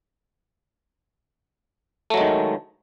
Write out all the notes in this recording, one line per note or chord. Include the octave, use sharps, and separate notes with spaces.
D#3 F#3 G#3 A3